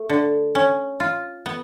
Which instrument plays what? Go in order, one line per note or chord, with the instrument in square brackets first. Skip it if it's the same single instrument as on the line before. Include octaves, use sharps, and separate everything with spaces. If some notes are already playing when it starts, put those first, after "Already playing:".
Already playing: [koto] A3
D3
C#4
F4
B3